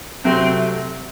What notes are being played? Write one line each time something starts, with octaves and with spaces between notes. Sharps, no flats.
C3 F#3 A3 C4